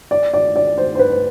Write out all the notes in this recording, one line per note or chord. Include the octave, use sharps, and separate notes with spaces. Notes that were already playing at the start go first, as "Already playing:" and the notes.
D5
D5
D5
C5
C5
B4